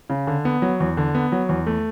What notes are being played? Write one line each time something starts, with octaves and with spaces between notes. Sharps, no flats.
C#3
D3
B3
F#3
E2
D3
B3
F#3
E2
A3